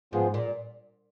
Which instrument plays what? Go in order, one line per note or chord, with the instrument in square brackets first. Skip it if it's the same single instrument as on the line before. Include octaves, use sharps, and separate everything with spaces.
[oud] G#2 [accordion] F3 B3 F4 G#4
[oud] A#2